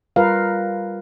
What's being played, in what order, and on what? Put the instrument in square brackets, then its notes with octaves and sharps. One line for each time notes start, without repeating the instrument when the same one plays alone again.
[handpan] G3 F4 A#4 B4 F5